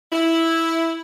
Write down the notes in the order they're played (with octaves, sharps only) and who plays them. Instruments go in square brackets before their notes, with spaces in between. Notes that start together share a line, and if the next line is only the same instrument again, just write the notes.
[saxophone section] E4